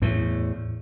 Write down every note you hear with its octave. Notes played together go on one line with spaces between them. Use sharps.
E2 A2